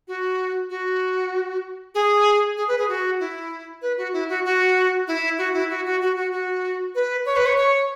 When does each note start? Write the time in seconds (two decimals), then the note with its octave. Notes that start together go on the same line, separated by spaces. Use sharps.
0.08 F#4
0.70 F#4
1.95 G#4
2.57 G#4
2.68 B4
2.78 G#4
2.89 F#4
3.20 E4
3.82 B4
3.97 F#4
4.13 E4
4.29 F#4
4.45 F#4
5.08 E4
5.38 F#4
5.54 E4
5.70 F#4
5.85 F#4
6.01 F#4
6.16 F#4
6.32 F#4
6.95 B4
7.26 C#5
7.36 B4
7.46 C#5
7.57 C#5